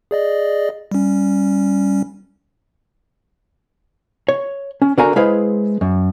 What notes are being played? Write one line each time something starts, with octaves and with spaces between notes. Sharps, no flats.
G#4 D5 D#5
G3 C#4
C#5
C#4
D3 F#4 A#4 F5 G#5 A#5
G#3 E4 G#4 B4 C5 F5
F#2